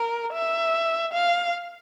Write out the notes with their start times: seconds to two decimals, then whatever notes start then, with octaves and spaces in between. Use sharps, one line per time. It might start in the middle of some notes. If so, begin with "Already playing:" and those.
Already playing: A#4
0.33 E5
1.13 F5